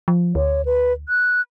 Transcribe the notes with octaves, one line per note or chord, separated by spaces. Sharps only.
F3
D2 C#5
B4
F#6